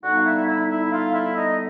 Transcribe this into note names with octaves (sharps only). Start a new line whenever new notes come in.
D3 G3 B3 D#4 F#4 F#5
F5
E4 E5
E4 E5
E4 E5
F4 F5
E4 E5
D#4 D#5